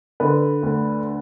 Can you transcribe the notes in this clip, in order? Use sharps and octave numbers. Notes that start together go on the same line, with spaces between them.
D3 B4
D2